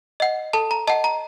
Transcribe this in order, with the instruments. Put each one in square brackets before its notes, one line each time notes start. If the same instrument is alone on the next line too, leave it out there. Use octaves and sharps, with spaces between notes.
[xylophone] D#5 F#5
A4 A5
A#5
D#5 F#5 A5
A#5